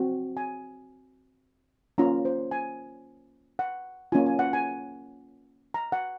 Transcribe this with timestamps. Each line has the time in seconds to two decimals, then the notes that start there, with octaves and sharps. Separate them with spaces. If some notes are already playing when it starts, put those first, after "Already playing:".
Already playing: C4 F#4
0.37 G#5
1.98 A#3 C#4 F4 A#5
2.25 C5
2.51 G#5
3.59 F#5
4.12 A#3 C#4 F4 G#5
4.26 G#5
4.39 F#5
4.53 G#5
5.74 A#5
5.92 F#5